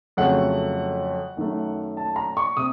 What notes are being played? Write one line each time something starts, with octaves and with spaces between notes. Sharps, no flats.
F2 C#3 F#3 A3 F#5
F#2 D#3 A3
A5
A#5
C#6
C3 D#6